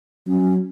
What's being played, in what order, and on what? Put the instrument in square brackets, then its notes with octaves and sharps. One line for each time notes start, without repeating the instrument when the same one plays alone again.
[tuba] F#3 [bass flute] C#4